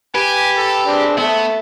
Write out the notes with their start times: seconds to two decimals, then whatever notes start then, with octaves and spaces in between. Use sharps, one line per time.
0.15 G4 B4 G#5
0.57 A4
0.87 C4 D4 G#4
1.17 B3 A4 E5 A5